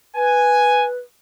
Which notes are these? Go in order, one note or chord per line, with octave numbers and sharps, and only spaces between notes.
B4 G#5